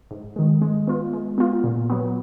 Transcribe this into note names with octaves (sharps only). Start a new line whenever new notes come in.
G#2
D#3 G#3
G#3
B3 F4
G#3
B3 F4
A#2
F#3 B3